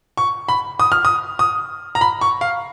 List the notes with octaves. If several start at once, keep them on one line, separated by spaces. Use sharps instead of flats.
C#6
B5
D#6
F6
D#6
D#6
A#5
B5
C#6
F5